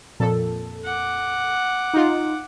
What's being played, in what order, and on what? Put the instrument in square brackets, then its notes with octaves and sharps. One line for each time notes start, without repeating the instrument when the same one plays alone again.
[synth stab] F2 A#2 A4
[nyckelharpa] F#5 D6
[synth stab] D#4 F4